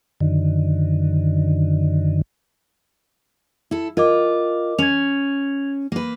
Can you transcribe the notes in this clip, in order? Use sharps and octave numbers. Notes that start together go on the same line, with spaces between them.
F#2 D3 D#3
E4 A4
F4 A#4 D#5 D6
C#4 G#6 F7
A#3 B4